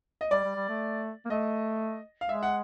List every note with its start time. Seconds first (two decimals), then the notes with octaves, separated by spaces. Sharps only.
0.21 D#5
0.31 G3 D5
0.44 G3
0.56 G3
0.68 A3
1.25 A#3
1.30 A3 D#5
2.21 F5
2.29 G#3 E5
2.43 F#5